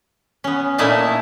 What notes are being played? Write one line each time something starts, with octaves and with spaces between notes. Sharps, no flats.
B3 C#4
A#2 A3 D#4 E4 G#5 A5